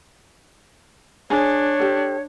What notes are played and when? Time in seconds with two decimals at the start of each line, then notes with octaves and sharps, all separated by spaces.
1.30 D4 G#4 C#5
1.80 G4 A4